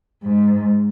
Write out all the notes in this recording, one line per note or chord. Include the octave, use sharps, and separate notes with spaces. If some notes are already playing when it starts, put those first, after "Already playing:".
G#2